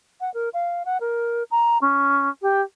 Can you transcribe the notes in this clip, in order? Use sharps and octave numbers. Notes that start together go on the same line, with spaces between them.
F#5
A#4
F5
F#5
A#4
A#5
C#4
G4